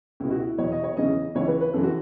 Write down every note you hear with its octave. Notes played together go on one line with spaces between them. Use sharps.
C#2 B2 E4
F#4
E4
E2 B2 C#5
D#5
C#5
E2 C#3 E3 D#5
C#2 C#3 E3 C#5
B4
B4
F#2 C#3 E3 A4
F#4